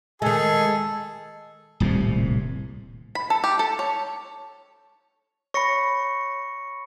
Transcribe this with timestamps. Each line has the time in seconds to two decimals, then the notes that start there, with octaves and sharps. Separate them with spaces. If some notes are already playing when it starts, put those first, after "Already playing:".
0.22 D#3 G#3 G#4 A4 G#5
1.80 D#1 C2 A2 C3
3.15 B5
3.30 A4
3.44 G4
3.59 A4
3.79 C#5
5.54 C#5 B5 C#6 A#6 C#7